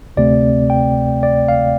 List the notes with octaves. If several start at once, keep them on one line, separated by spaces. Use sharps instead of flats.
D2 C3 A3 C4 D5
G5
D5
F5